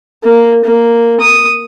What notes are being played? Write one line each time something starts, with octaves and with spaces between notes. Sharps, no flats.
A#3
A#3
D#6